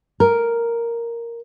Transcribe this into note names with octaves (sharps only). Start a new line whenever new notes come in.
A#4